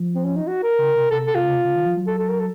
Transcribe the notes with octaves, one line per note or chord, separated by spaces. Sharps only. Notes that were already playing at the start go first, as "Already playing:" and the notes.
Already playing: F3
C4
C#4
D#4
F#4
A#4
C#3
C3
C3 A4
A4
C3 F4
C#3
C3
C#3
D#3
F3
F#3
A4
A4
A#4
A4